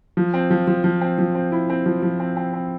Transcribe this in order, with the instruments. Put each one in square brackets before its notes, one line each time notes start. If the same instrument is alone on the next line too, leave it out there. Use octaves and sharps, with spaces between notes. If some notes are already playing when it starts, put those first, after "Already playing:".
[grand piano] F3
C4
F3
F3
F3
C4
F3
C4
E4
C4
F3
F3
C4
C4
C4